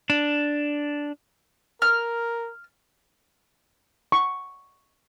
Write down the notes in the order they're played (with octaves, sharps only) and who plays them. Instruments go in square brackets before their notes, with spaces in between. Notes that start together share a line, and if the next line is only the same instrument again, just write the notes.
[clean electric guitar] D4
[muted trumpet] A#4 [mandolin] F6
[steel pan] C#6